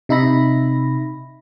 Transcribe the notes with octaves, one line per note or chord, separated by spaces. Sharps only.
C3 D#4 E5 B5 A#6